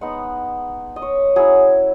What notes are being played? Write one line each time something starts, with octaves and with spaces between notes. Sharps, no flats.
G#3 B3 D#4 F#5
D#5
C#5
F#3 C#4 E4 G#4